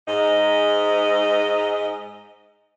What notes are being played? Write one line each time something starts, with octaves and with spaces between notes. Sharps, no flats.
G#2 D#5